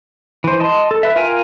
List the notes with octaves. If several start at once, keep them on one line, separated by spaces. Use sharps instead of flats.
E3 C5
D#5 A5 C6
A4
B4 E5
F4 A#4 F5 G5 G#5